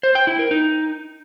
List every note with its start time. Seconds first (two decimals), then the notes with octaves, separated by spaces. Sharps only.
0.03 C5
0.15 G5
0.27 E4
0.39 A#4
0.51 D#4